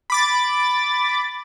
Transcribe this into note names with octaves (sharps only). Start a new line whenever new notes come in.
B5 D6 A6